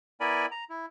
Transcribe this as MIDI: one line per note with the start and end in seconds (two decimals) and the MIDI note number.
0.20 0.46 59
0.20 0.46 64
0.20 0.46 70
0.20 0.46 74
0.20 0.46 80
0.20 0.46 83
0.51 0.64 82
0.70 0.86 64